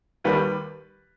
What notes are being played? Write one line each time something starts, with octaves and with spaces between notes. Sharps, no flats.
D#2 D#3 G3 B4